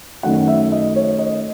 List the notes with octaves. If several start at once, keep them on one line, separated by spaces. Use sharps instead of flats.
F#2 D#3 F#3 A3 F#5
E5
D#5
C#5
D#5